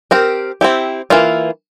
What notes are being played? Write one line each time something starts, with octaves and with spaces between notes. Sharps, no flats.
C4 G4 A#4
C4 E4 G4
E3 A#3 F4